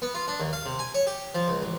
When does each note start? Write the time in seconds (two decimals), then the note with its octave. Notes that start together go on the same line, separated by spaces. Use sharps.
0.02 B3
0.15 F4
0.28 D4
0.40 D#2
0.53 F5
0.66 C3
0.79 G#5
0.95 C#5
1.07 G4
1.35 F3
1.48 C#2
1.62 A1